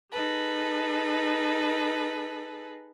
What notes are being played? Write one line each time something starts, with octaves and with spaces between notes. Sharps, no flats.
D#4 G#4 A4 B4